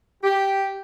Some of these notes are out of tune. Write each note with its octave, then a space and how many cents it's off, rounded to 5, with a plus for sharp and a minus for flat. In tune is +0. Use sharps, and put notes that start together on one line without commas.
G4 -5